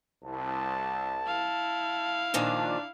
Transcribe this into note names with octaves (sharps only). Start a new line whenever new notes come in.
C2 A5
E4 F5
A#2 D#3 F3 D4